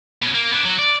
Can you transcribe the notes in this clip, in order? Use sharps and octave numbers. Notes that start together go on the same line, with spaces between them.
B2 C#4
A#3
B3 D4
F#3
D5